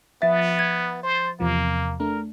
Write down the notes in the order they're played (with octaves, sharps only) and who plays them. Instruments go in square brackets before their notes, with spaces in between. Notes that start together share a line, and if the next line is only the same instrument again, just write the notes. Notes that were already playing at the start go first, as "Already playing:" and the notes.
[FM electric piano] F3 A6 [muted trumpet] B3 [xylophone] E5
[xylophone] G#6
[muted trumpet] C5
[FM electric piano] E2 C3 F3 [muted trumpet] A#3
[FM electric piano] A3 D4 [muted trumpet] A#4